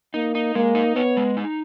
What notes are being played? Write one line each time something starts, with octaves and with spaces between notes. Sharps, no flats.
A#3 D#4
D#4
G#3 A#3
D#4
B3 C#5
G#3
D#4